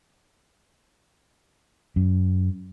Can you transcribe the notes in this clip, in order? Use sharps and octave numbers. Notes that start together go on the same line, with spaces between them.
F#2